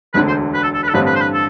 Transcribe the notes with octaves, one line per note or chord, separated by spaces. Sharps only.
E1 D2 D3 B4
C5
B4
A4
A4
B4
A4
A1 G2 D3 G3 C4 B4
B4
C5
B4
A4